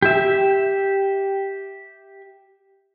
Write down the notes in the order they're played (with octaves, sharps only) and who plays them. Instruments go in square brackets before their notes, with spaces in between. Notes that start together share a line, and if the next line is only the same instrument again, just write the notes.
[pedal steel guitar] G4 E5